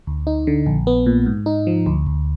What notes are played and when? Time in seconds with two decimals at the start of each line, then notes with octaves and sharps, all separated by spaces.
0.07 D2
0.27 D#4
0.47 D3
0.66 A#1
0.87 B3
1.06 A#2
1.26 G#2
1.46 D#4
1.67 F3
1.86 D2
2.07 D2